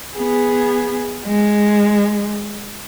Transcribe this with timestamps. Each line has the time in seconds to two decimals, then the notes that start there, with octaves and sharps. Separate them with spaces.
0.17 B3 G#4
1.26 G#3